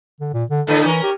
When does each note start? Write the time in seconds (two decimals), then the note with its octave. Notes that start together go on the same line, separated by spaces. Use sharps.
0.21 D3
0.34 A#2
0.50 D3
0.67 A2 D3 A4 B4
0.84 E3 C#4 A#4
1.03 G4